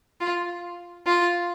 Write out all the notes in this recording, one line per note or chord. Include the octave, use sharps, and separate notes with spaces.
F4
F4